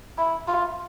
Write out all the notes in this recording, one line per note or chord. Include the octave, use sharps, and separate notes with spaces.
E4
F4